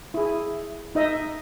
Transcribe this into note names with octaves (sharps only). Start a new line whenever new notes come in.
E4 G#4
D#4 D#5 E5